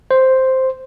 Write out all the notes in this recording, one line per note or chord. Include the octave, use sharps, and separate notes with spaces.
C5